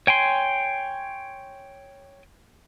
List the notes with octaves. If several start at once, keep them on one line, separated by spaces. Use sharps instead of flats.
C#5 G5 G#5 C6